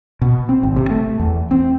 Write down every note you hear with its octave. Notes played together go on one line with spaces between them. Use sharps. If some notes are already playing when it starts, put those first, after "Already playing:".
B2
C4
G#1
C3
A3
E2
C4